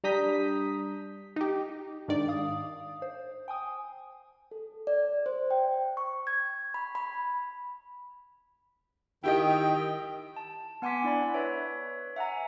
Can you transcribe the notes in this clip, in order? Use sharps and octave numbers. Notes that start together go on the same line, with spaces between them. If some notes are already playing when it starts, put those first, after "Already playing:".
G3 D4 A#5 D#6 G6 B6
D#4 G4
G#2 D#3 D4 D5
F5 D#6
C5
G5 G#5 D#6
A4
D5
C5
G5
C#6
G#6
B5
B5
D#3 E4 G4 D#5 G5
A5
B3 F#5 G#5 C6 D6 B6
D4 E4 D5 B5
B4 C#5 E5
E5 F#5 G#5 A#5